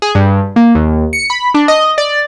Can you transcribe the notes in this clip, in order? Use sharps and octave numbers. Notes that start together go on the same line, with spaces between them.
G#4
G2
A#3
D#2
C#7
B5
D4
D#5
D5